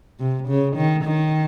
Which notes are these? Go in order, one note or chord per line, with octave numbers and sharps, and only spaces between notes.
C3
C#3
D#3
D#3